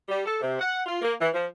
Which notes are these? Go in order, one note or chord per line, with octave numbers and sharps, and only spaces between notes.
G3
A4
C3
F#5
F4
A#3
E3
F3